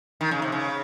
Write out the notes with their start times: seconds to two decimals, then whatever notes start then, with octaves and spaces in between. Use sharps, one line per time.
0.21 D#3
0.31 C#3
0.42 C3
0.52 C#3